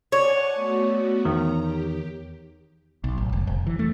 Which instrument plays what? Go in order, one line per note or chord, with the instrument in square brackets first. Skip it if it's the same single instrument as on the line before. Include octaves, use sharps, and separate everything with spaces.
[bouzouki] C#5 [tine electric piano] D5 C#6 [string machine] F#5 G#5 A5
[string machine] A3 B3 F#4
[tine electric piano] E2 D#3 [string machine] A#5
[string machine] G4
[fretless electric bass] B1
A1
F1
F1
E3
A3